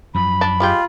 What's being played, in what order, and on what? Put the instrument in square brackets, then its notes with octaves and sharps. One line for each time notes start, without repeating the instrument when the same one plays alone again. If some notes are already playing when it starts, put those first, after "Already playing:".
[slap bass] F#2 F3 [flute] B5
[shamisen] D4
[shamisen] G3 G#3 G4 [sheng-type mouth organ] F4